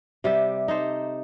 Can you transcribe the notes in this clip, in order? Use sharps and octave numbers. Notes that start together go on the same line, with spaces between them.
C3 G3 G4 E5
D#4 A4 C5